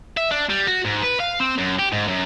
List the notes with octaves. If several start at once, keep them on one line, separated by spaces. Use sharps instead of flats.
E5
D4
G3
F#4
G#2
B4
F5
C4
F#2
G4
G#2
F#2